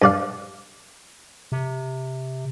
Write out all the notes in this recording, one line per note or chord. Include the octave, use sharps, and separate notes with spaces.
G2 D5 F5
C3